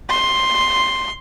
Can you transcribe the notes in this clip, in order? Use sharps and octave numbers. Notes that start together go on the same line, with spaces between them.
C6